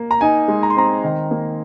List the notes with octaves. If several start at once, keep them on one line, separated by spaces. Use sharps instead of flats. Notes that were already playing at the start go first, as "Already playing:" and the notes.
Already playing: A#3
A#5
D#4 G#5
G#3
A#5
C6
C4 A#5
D#3
A#3